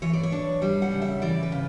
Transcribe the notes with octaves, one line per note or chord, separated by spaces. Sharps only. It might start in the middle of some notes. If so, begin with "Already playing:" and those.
E3 C#5
D5
C#5
D4
G3 E5
F#5
C#3
E5
E3 D5
B4
C#3